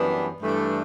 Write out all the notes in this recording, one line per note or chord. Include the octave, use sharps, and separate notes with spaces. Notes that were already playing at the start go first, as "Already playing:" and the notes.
Already playing: F#2 E3 G3 B3 D4
G2 E3 A3 D4